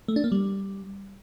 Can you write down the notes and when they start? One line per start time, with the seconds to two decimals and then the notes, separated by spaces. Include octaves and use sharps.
0.08 A3
0.16 D4
0.24 A#3
0.32 G3